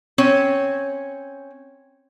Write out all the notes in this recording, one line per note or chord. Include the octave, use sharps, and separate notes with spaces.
C4 C#4 C#5